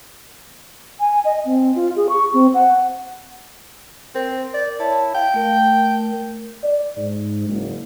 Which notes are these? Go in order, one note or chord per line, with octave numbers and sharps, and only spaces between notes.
G#5
D#5
C4
F4
G#4
C#6
C4
F#5
C4 A#4
D5
E4 C#5 A5
F5 G5
A3 A#4
D5
G#2
F#1